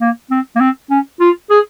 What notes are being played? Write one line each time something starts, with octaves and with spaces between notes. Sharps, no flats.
A#3
C4
A#3
C4
C#4
F4
G#4